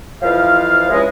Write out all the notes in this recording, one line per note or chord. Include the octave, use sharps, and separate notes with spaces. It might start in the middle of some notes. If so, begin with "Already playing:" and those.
F2 E3 F3 F5
C#2 G2 E3 G#3